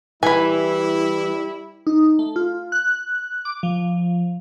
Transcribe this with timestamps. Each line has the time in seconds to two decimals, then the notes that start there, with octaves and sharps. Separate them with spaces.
0.23 E3 G3 E4 G#5 B5
1.87 D#4
2.19 A3
2.36 F4
2.72 F#6
3.45 D6
3.63 F3